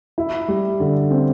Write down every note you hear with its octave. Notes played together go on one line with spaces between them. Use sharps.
E4
G3
D3
C4